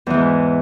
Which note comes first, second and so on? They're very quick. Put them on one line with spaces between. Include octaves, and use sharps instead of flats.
E2 E3 G#2